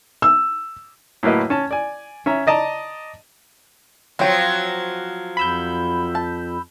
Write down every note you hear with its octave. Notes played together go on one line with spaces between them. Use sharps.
E6
A2 F#3 A#3 B4 D#5
C#4 A5
D5 G#5
C#4 E5 A#5
D5 D#5 A5 A#5
F3 F#3 C4 C#5 G5
F2 B5 E6 G6
A5